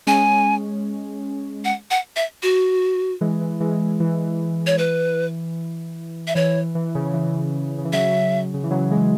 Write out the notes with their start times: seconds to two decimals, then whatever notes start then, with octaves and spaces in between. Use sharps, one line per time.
0.07 G#3 C#4 G#5
1.65 F#5
1.91 F#5
2.16 E5
2.43 F#4
3.21 E3 G#3
3.41 E3
3.60 E3 G#3
4.00 E3
4.67 C#5
4.78 B4
6.27 E5
6.35 E3 C#5
6.55 E3
6.75 E3
6.95 C#3
7.14 E3
7.78 C#3
7.85 E3
7.93 C#3 F#3 E5
8.54 C#3
8.63 E3
8.70 C#3 F#3
8.91 E3 G#3